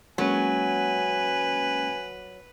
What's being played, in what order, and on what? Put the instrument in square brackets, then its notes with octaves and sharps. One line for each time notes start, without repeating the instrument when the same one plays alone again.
[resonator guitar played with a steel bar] F#3 [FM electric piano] G#3 A#3 C#4 [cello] B4 [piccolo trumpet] G#5